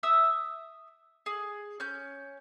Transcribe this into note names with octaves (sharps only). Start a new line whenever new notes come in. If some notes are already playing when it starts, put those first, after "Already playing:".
E5 D#6 E6
G#4
C#4 G6